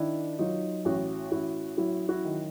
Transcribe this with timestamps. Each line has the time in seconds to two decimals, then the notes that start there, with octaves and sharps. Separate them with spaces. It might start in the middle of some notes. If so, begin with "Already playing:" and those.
Already playing: D#3 D4 E4
0.39 F#3 D#4 F4
0.85 A1 E4 F#4
1.32 A1 E4 F#4
1.78 F#3 E4 F#4
2.09 E4 F#4
2.25 D#3